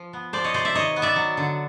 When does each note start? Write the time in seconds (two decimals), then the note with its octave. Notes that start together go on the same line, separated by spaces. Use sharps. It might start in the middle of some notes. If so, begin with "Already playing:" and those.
Already playing: F3
0.13 B3
0.33 F3 C5 D5
0.44 C#5 D#5
0.54 C3 C5 D5
0.65 D5 E5
0.74 D#3 C#5 D#5
0.96 B3
1.02 D5 E5
1.16 F#3
1.37 D3